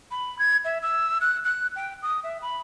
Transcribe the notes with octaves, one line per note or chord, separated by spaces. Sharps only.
B5
G#6
E5
E6
F#6
F#6
G5
D#6
E5
B5